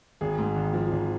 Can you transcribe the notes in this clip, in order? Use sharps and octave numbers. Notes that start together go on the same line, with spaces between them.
G#1 G#4
G#2
G#1
F3
G#1